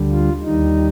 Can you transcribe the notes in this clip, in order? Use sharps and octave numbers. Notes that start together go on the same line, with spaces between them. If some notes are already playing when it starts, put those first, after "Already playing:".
Already playing: D2 D3 G3
F4
D#2 D#3 G3 D#4